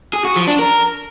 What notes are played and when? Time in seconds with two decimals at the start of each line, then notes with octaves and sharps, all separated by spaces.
0.14 G#4
0.25 F#4
0.36 F3
0.48 D4
0.59 A#4